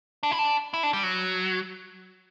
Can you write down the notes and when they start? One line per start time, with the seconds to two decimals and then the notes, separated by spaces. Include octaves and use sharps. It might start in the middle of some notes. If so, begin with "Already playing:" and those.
0.23 D4
0.31 E4
0.39 D4
0.74 E4
0.83 D4
0.93 G3
1.03 F#3